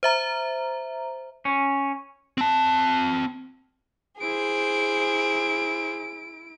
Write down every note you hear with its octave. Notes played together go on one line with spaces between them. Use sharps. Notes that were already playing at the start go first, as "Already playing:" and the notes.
C5 E5 A#5
C#4
C4 A5
E4 G#4 C5 D7